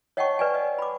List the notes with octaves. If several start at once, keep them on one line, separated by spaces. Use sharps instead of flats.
C#5 D#5 F#5 G5 A5 C#6
B4 D5 G#5
D#5
B5 D6